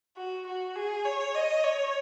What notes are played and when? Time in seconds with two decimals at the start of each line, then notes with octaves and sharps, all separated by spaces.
0.17 F#4
0.47 F#4
0.76 G#4
1.05 C#5
1.35 D#5
1.64 C#5